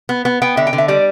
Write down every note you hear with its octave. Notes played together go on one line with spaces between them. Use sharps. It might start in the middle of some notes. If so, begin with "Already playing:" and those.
B3
B3
B3 G5
D3 E5
G5
D3
E5
G3 D5